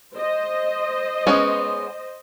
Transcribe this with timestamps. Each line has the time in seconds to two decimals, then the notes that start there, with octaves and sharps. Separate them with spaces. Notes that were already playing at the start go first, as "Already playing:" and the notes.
0.14 C5 D#5
1.27 G#3 B3 C#4